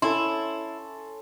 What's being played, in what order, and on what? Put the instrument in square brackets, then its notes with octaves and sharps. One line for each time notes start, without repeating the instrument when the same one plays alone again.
[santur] C#4 A4 [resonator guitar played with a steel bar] E4 [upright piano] C6